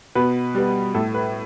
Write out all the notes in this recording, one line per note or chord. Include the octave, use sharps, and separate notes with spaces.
B2 B4
G3 B3
A2 A4
B4